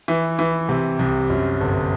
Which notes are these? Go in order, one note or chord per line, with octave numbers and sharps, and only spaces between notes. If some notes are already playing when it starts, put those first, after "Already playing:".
E3
E3
C3
C2
F#2
G1